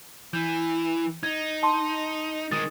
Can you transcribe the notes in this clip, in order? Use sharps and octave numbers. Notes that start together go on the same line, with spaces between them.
E3 G6
D#4 G#6
A5 C6
D#3 G#3 D#6 A6